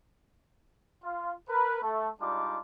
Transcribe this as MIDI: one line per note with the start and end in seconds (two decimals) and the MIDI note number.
1.04 1.32 65
1.48 1.81 70
1.48 1.81 71
1.82 2.08 57
2.20 2.58 55
2.20 2.58 56
2.20 2.58 62
2.20 2.58 63
2.20 2.58 65
2.20 2.58 86